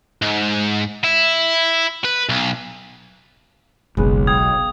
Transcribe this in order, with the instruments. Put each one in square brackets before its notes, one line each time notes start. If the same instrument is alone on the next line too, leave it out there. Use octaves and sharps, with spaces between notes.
[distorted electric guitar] G#2
E4
B4
B1
[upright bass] F#1 [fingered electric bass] B1 [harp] G#3 B3
[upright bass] F4 [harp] F5 G5 [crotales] D#6 G#6